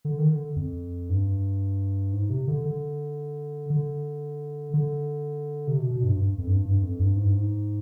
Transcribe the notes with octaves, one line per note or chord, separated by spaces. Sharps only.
D3
D#3
D3
F2
G2
G#2
C3
D3
D3
D3
D3
C3
B2
B2
G2
G2
F2
G2
G2
F2
G2
G#2
G2
G#2